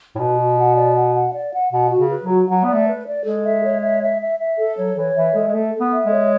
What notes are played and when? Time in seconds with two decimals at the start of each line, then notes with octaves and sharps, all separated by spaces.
0.15 A2
0.19 B2 B4
0.38 F#4
0.57 F#5
0.76 D5
0.95 F#5
1.15 F#5
1.33 D5
1.53 F#5
1.72 B2 F#5
1.91 F#4
1.98 C#3
2.10 B4
2.23 F#3
2.29 F#4
2.49 F#3 F#5
2.64 B3 D5
2.73 A3
2.87 B4
3.06 D5
3.25 G#3 A4
3.44 E5
3.63 C#5
3.82 E5
4.02 E5
4.20 E5
4.39 E5
4.58 A4
4.77 F#3 C#5
4.96 E3 C#5
5.15 E3 E5
5.35 G#3 A4
5.47 G#3
5.54 A3 A4
5.73 A4
5.80 B3
5.92 E5
6.05 G#3
6.11 C#5